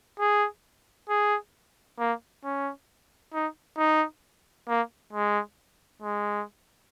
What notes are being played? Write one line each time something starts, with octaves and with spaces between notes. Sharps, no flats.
G#4
G#4
A#3
C#4
D#4
D#4
A#3
G#3
G#3